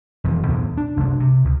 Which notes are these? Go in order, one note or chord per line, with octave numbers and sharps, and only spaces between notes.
E1 F2 D#3 E3
B1 E2 A2
D4
F#1 C2 G#3 D4
C3
C#2